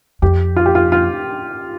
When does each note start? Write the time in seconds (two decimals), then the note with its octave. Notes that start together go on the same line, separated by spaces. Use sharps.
0.22 F2 G4
0.56 F4
0.66 G4
0.75 F4
0.92 F4